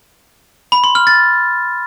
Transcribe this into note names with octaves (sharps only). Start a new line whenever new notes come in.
B5
C6
F6
A6